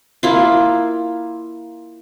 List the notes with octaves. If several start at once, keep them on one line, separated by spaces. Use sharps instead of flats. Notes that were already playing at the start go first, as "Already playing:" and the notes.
A#3 E4 F4